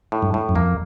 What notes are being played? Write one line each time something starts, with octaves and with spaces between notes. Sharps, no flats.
A2
G2
A2
F#2
F2 A#3